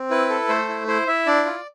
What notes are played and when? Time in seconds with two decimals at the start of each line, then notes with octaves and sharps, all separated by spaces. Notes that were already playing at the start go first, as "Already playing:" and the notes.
Already playing: C4
0.10 E4 B4
0.29 A4
0.49 A3 C5
0.69 E4
0.87 E4 C5
1.07 E4 E5
1.26 D4 D5
1.46 F4